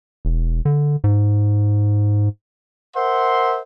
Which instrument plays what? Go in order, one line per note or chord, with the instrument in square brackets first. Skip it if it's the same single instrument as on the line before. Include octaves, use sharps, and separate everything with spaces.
[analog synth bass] E1
D3
G#2
[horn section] A#4 C5 E5 F#5 C6